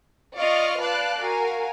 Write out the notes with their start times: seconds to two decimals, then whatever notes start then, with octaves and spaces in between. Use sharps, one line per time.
0.36 F4 D5 D#5 F5 C#6 F6
0.80 B4 D5 F5 A5 F#6
1.20 F#4 A#4 F5 G#5